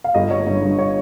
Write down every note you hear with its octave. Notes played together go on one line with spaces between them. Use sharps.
F5
G1 D#5
G1 C#5
G2
G2
C#5